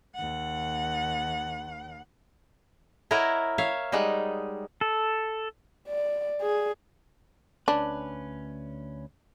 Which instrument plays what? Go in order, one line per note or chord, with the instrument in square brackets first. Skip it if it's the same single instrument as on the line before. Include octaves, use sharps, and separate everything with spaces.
[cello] D#2 F#5
[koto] E4 A#4 C#5 D#5 E5 F#5
C#5 E5 F5
G3 G#3 D#4 F#5
[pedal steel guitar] A4
[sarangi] D5
G#4
[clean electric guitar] D2 C#4 B4 [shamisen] D4